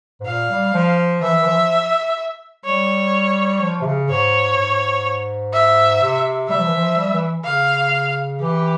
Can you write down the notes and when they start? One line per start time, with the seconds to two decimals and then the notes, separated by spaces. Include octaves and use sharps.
0.20 G#2
0.26 A#2 F5
0.50 G3
0.74 F3
1.22 E3 E5
1.41 E3
1.46 F3
2.65 G3 C#5
3.62 F3
3.81 C3
3.86 C#3
4.09 G#2 C#5
4.57 G#2
5.53 E5
6.01 C3
6.48 G3 E5
6.57 F3
6.67 E3
6.75 F3
6.97 G3
7.14 E3
7.45 C#3 F5
8.41 E3 G4